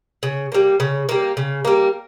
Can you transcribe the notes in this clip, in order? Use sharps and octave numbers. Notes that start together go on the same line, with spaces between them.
C#3
G3 A#3
C#3
G3 A#3
C#3
G3 A#3